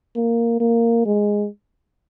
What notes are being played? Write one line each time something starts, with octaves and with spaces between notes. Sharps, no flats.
A#3
A#3
G#3